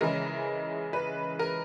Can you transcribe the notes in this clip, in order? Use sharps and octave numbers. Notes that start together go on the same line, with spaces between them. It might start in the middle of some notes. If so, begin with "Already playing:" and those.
C#3 E3 G#3 A#4
B4
A#4